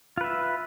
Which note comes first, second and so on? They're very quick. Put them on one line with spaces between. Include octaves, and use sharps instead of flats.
F4 B4 E5